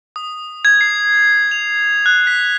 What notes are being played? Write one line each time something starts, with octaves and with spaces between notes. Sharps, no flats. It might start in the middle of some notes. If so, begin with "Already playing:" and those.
D#6
G#6
C7
F7
F#6
B6